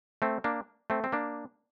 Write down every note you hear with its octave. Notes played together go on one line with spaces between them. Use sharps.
A3 C4
A#3 D4
A3 C4
C4
A#3 D4